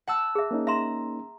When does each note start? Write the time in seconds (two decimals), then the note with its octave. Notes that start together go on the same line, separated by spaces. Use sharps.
0.07 F#5 A5 E6
0.35 G#4 E5
0.51 A#3 C#4 D#4
0.67 E5 A#5 C6 E7